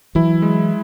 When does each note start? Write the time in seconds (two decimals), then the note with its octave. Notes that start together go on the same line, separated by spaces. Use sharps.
0.15 E3 F#3 E4
0.42 G#3